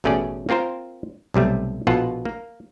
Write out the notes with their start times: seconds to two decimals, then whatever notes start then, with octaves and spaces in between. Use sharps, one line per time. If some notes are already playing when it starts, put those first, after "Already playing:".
0.04 A1 B2 A3 C#4 G#4 D5
0.49 A#3 C4 F4 A#4 C5
1.34 B1 C3 G3 A3
1.87 A#1 B2 F4 A4 F#5
2.25 A#3